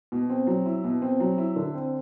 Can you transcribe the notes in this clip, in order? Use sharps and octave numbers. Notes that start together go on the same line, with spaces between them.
B2
C4
F#3
E4
B2
C4
F#3
E4
D3
C4